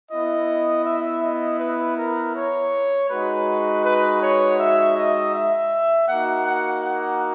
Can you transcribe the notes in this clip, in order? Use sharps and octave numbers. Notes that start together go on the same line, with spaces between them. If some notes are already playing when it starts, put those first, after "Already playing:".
B3 E4 D#5
E5
D#5
B4
A#4
C#5
G#3 D#4 F#4 B4
B4
C#5
E5
D#5
E5
A#3 D#4 F#4 F#5
F#5
F#5